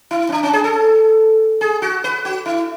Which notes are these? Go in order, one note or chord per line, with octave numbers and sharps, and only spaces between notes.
E4
C#4
D4
C#4
G#4
A4
G#4
F#4
B4
F#4
E4